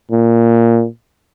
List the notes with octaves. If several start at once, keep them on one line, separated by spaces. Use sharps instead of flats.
A#2